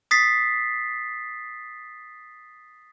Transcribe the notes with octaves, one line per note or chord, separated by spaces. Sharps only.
D#6 A6 B6 C7